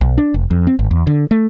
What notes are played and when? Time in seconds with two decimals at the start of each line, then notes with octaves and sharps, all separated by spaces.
0.01 B1
0.18 D4
0.34 F1
0.51 F2
0.67 C4
0.79 G#1
0.91 E2
1.07 D3
1.31 A3